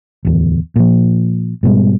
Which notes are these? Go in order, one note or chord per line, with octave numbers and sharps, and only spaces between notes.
D1 E2
A#2 F3
G#2 B2 G3